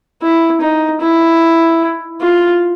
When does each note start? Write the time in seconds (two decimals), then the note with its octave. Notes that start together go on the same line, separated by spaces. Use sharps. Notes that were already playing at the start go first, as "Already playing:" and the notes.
0.22 E4
0.61 D#4
1.01 E4
2.21 F4